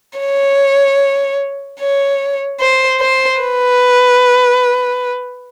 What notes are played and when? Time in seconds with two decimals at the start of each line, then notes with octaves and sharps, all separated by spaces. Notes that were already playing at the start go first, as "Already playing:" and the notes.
0.19 C#5
1.80 C#5
2.60 C5
3.01 C5
3.41 B4